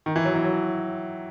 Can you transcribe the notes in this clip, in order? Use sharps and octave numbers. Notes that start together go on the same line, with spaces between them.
D#3
E3
F#3
E3
F#3